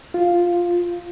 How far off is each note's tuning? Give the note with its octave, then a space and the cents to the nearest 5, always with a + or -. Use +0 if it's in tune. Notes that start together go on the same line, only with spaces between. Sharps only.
F4 +0